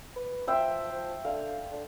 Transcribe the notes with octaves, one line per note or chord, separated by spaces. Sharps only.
B4
F3 C5 E5 G5
F3
D3 F5
D3